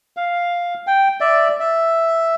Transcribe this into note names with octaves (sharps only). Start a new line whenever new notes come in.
F5
G5
D5 E5
E5